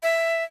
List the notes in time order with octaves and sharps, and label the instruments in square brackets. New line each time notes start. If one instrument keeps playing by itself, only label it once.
[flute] E5